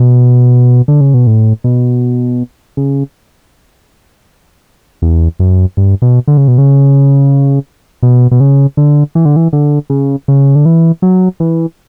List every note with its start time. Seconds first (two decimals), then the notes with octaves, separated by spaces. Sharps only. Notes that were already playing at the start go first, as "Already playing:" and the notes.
Already playing: B2
0.88 D3
1.01 C#3
1.14 B2
1.27 A2
1.64 B2
2.77 C#3
5.02 E2
5.40 F#2
5.77 G2
6.02 B2
6.28 D3
6.37 C#3
6.48 B2
6.58 C#3
8.03 B2
8.31 B2
8.40 C#3
8.77 D3
9.15 E3
9.25 D3
9.36 E3
9.53 D3
9.90 C#3
10.28 C#3
10.55 D3
10.66 E3
11.02 F#3
11.40 E3